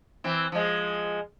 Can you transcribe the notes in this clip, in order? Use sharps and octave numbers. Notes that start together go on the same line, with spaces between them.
E3 C4
F3 G#3